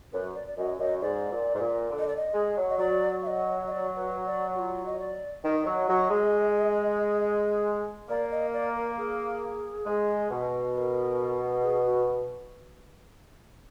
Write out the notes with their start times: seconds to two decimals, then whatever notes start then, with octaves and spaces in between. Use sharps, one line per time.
0.12 F#2 B4
0.35 D5
0.47 D5
0.57 F#2 D#5
0.79 F#2 D#5
1.01 G#2 D5
1.31 A#2
1.55 G#2
1.60 A#2
1.90 D3
1.99 D#5
2.07 D5
2.16 D#5
2.33 G#3
2.56 F#3
2.69 D#5
2.78 F#3 D5
3.22 F5
3.27 D#5
3.67 D#5
3.71 D5
3.96 B4
4.26 D5
4.54 F#4
4.59 F4
4.85 D#5
4.99 D5
5.43 D#3 D#5
5.65 F#3
5.88 F#3
6.09 G#3
8.09 A#3 D5
8.31 D#5
8.53 D5
8.75 A#4
8.97 G#4
9.85 G#3
10.29 B2
10.74 B4
10.77 A#4
11.62 G#4
11.85 F#4